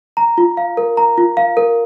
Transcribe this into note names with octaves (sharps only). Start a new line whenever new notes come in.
A#5
F4
F5
A#4
A#5
F4
F5
A#4